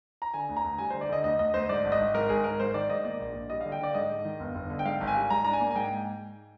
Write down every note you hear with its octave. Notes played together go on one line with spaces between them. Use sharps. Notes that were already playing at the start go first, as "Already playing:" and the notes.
A#5
D3 G#5
D2
A#5
D2
G3 G#5
D3 C5
D5
D3 D#5
D2 D#5
D2 D#5
D2 C5
G#2 D5
G#1
D#5
G#1
G#2 A#4
G#1 G#4
G#1 A#4
G#2 C5
D#3 D5
G#2 D#5
A#3 D5
A#1
A#1
G3 D#5
D3 F5
G5
D3 D5
G#2 D#5
G#2
D#3
G1
G1
D3
G5
G#2 F5
G#1
G#5
G3
G#2 A#5
D4 A#5
G#5
A#3
G#5
G#2 G5